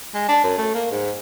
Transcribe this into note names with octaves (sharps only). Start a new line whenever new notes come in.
G#3
D4
F#2
A3
A#3
G#2